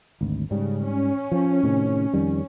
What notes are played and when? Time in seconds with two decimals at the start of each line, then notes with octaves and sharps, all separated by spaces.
0.21 G#1 D2
0.51 G#2 C#3 G3
0.84 C#4
1.32 F3
1.63 A2 C3 D#3
2.13 F2 D#3 G3